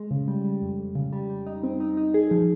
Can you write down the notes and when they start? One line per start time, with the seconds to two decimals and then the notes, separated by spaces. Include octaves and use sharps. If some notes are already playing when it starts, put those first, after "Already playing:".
Already playing: G#3
0.11 C#3
0.28 G3
0.45 G3
0.62 F2
0.79 F2
0.95 C#3
1.13 G3
1.30 G3
1.46 D#4
1.63 C4
1.80 D#4
1.97 D#4
2.14 G#4
2.31 F3